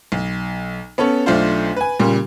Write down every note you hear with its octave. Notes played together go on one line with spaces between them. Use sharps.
B1
B3 C#4 A4 C#5
B1 A3 D4 F4 C5
B4 G#5
A#2 C#3 G3